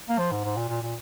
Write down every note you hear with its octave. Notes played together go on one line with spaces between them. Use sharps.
A#3
F3
G#2
G#2
A#2
A#2
A#2